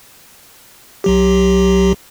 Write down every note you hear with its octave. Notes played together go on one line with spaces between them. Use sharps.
B1 F#3 G4